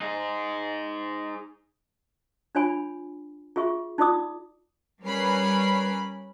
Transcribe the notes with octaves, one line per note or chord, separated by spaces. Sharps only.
D#4 G#4
D4 F4 C#5 G#5 B5
F4 G#4 E5 C#6
D#4 F4 D5 D6 D#6
G3 C#4 A#4 B4 B5 C7